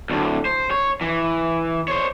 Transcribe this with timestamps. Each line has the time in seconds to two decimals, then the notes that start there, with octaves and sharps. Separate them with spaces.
0.10 D2 A2
0.45 C5
0.71 C#5
1.01 E3
1.88 C5 C#5